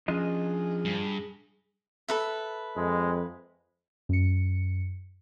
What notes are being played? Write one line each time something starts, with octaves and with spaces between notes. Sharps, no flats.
F3 C#4 D4 F4 G#4 D#5
G2
A4 B4 E5
F2 G#3
F#2 C#7